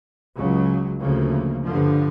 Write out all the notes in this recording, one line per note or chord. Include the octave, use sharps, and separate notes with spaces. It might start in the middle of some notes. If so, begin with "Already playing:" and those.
C#2 C#3 F#3
D2 C#3 F3 A#3
G2 D3 F3